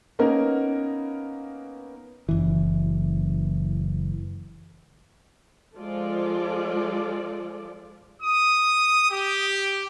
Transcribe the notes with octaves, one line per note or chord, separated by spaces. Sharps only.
A#3 B3 C#4 D#4 A#4
F#1 E3
F3 G#3 F4 A4 D5
D#6
G4